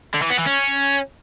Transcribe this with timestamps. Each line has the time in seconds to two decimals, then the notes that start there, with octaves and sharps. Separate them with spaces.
0.14 D3
0.22 E3
0.30 B3
0.38 E3
0.46 C#4